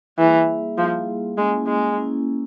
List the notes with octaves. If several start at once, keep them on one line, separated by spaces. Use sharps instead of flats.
E3 G3 A#3 E4 G#4
F3 G3 A#3 E4 G#4
G#3 A#3 C#4 E4
G#3
A#3 C#4 E4